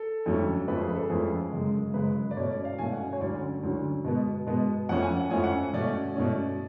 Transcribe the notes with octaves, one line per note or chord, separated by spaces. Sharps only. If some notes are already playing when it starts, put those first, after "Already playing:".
Already playing: A4
F2 D3 F#3 A3 C#4
F2 F3 A3 C#4 B4
G#4
B4
A4
F2 F3 A3 C#4 G#4
F#2 C#3 G#3
F#2 C#3 G#3 B4
D5
B2 A3 C#4 C#5
D5
F5
B2 A3 C#4 G#5
F#5
C#5
D2 D3 F#3 C#4 D5
D2 D3 F#3 C#4
B2 G#3 B3
B2 G#3 B3
F2 F3 A3 C#4 F#5
G#5
F#5
F2 F3 A3 C#4 G#5
F#5
B2 A3 C#4 D5
B2 A3 C#4